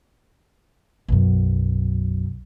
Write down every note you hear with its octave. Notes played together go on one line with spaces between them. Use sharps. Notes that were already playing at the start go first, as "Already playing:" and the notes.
B1 F#2